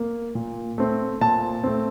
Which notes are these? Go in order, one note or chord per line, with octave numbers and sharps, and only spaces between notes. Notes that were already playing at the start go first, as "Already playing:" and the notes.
Already playing: A#3
A#2
A3 C4
A#2 A5
A3 C4